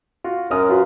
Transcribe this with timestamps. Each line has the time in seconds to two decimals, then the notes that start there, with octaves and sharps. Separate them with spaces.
0.24 F4 F#4
0.50 F#2 C#4 A#4 D#6
0.69 F4 F#4 B4